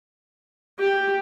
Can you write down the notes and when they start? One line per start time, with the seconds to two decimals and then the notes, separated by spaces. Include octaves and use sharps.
0.79 G4